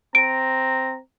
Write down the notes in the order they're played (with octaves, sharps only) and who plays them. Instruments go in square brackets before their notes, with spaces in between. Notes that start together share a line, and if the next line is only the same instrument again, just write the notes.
[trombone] C4 [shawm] A#5 [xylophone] D7